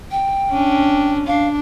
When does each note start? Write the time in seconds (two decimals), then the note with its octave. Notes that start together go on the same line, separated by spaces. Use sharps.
0.11 G5
0.51 C#4 D4
1.27 D4 F5